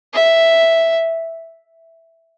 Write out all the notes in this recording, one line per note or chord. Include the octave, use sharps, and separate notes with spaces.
E5